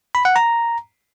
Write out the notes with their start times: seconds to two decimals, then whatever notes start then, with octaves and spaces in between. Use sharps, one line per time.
0.15 B5
0.25 F#5
0.36 A#5